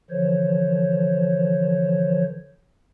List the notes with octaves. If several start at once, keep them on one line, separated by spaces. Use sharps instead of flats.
D3 E3 F3 C5 C#5